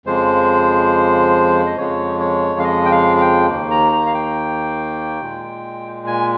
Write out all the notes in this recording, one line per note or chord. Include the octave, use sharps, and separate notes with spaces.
F2 C#3 F3 G#3 C5
D#5
F2 C#3 F3 G#3 C#5
C#5
F5
D#5
G5
F5
F5
G5
D#2 D#3 A#3
A#5
A#5
F5
G5
A#2 G#3
G#5